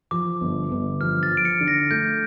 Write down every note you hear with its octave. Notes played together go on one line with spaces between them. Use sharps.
F3 D6
G1
G1
F3 F6
A6
F3
D7
C#7
D3
A#6
A3 G6